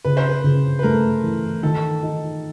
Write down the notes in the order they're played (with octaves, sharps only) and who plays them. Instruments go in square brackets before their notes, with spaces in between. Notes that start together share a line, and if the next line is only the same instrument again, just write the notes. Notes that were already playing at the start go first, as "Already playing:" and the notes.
[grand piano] C#3 [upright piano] B4
[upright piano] C5
B4
[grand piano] C#3
[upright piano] B4
[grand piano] A3 [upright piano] A#4
[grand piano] E3
[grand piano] D#3 [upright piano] A4
[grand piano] D#4